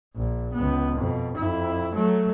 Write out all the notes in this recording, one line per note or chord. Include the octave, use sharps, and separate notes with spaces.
A#1
C#2 B3
F2 B2
F2 E4
F#3 A3